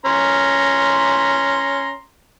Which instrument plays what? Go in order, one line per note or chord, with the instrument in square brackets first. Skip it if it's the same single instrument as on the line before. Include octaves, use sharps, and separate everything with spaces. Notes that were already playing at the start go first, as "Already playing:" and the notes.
[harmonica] C#4 A#5 C6